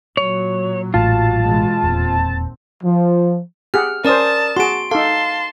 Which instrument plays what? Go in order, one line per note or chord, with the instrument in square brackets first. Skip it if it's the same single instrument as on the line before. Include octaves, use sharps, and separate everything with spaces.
[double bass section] A#2 F#3 [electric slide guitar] C#5
[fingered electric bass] A1 A2 [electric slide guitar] F4 [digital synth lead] A5
[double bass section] B2 E3 G#3
[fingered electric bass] E1 [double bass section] D#2 A#2 C4
[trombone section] F3
[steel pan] G4 G#4 F#5 [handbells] F6
[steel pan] C#4 C5 [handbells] A#4 D5 D#6 [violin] A5
[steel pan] F#4 G#4 [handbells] C6 D7
[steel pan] D#4 A4 [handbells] F5 [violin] A5 C6